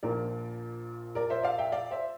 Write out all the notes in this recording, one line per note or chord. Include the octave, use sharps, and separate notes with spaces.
A#1 A#2 F3 A#4 D5
A#4 D5
C5 E5
D5 F5
E5 G5
D5 F5
C5 E5